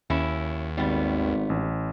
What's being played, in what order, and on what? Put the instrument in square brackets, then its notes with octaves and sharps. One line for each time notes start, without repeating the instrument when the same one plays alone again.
[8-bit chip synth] D#2 [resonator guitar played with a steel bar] C#4 E4
[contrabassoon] G#1 [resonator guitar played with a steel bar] G3 B3
[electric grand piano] A1